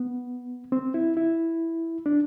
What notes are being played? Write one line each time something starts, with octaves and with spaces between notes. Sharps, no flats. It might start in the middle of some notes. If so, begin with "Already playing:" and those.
Already playing: B3
C4
E4
E4
D4